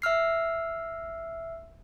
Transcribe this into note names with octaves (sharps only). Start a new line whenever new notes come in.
E5 E6 F6 C7